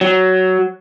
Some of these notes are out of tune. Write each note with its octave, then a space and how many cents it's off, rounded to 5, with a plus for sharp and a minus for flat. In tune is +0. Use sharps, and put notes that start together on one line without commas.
F#3 +10